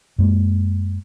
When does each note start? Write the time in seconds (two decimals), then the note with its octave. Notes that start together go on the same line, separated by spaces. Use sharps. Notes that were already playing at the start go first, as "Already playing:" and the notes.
0.18 F#2 G#3 A#3